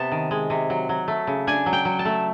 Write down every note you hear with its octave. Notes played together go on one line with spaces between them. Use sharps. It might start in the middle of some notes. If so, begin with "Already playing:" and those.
Already playing: C3 B3 A5
D#3
G#3
C3
F#3
F#3
A3
C#3
D4 G#5
F#3
G5
F#3
A5
A3